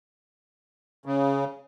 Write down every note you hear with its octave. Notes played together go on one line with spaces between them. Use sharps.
C#3